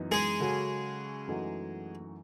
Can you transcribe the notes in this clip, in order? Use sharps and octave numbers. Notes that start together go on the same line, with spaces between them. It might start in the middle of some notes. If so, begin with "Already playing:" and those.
Already playing: F#2 E3 B3 D#4
G#3 G#4
C#3 F#3 C#4 F#4 A4
F#2 E3 A3 D#4 F#4